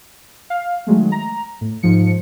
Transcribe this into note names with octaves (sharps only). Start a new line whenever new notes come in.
F5
D#3 F#3 G#3 A3
A#5
A2
G#2 F3 C#7